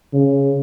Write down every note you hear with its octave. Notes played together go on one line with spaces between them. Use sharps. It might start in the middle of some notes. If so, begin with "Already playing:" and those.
C#3